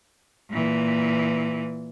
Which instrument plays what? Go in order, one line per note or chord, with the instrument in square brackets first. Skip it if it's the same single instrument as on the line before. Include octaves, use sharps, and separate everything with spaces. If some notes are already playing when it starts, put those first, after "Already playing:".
[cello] A#2 E3